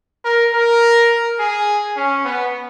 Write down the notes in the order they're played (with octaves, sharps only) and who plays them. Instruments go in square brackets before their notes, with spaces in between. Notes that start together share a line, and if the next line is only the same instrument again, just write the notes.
[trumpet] A#4
A#4
G#4
C#4
B3